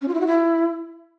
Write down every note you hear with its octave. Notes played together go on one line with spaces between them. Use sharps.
C#4
F4
E4
F#4
E4